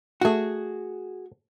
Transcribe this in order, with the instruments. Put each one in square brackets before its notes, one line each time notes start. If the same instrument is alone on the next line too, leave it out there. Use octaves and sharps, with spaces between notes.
[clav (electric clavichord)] A3 F#5 [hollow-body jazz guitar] F#4 G#4